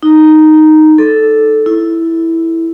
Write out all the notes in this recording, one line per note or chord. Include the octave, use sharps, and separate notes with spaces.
D#4
A4
E4